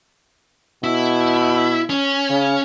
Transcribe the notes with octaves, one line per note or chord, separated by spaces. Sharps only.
B2 E4
C#4
C#3